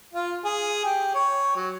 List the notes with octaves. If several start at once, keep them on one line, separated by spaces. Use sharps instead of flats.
F4
G#4
G4
C#5
F#3